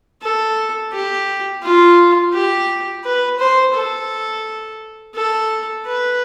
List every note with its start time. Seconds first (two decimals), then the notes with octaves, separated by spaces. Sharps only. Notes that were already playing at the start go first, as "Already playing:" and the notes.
0.22 A4
0.93 G4
1.63 F4
2.33 G4
3.04 B4
3.39 C5
3.75 A4
5.15 A4
5.86 B4